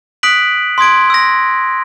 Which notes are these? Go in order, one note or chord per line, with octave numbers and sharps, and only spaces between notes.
D#6 F#6 B6 D7 F#7
C6 D#6 G#6 D7
E6 A#6